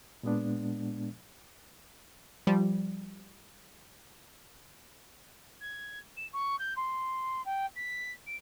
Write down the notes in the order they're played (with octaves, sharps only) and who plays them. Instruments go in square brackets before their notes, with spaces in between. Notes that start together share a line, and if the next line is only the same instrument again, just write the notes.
[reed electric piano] A#2 G#3 B3 D4
[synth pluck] F3 G3
[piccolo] G#6
E7
C#6
G6
C6
G5
B6
D7